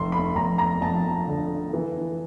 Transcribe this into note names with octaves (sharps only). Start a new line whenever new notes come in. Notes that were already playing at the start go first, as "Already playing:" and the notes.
Already playing: F1 C6
B5
F1 A#5
A#5
F2 A5
D3
E3